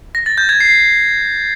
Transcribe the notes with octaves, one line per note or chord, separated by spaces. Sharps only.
A#6
A6
G6
G#6
C7